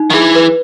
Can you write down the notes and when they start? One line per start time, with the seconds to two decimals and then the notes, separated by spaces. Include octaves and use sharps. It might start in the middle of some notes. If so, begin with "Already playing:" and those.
Already playing: D#4
0.10 D#3
0.14 E3 G#4
0.35 B4